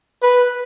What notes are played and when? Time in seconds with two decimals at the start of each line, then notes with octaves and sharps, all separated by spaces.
0.22 B4